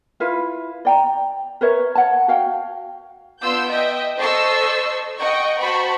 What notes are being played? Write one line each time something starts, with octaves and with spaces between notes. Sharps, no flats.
E4 F4 B4 F5
D5 G5 A#5
A#4 B4 C#5 E5
C#5 F#5 A5
F#4 F5 G5
B3 D4 F4 C6 E6 G6
D#5 E5 G5
A4 C5 D#5 C#6 E6 C7
D#5 F#5 G5 C#6
F#4 C5 A5 B5 C#6